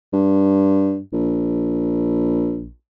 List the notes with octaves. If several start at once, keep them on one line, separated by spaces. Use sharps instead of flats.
G2
A#1